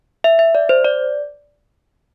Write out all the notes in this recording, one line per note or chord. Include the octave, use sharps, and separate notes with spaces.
E5
E5
D5
C5
D5